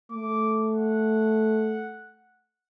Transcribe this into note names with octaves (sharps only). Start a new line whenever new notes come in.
A3 D6
F#5